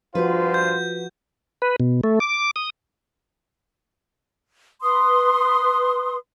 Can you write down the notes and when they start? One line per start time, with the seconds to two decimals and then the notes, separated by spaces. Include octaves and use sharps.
0.15 G2 F3 F4 F#4 B4 C5
0.54 G6
1.62 B4
1.80 B2
2.04 A3
2.20 D6
2.56 D#6
4.82 B4 C6 D#6